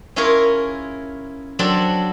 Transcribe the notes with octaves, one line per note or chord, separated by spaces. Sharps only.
C#4 E4 F4 G#4 A#4 C#5
F#3 C4 D4 A4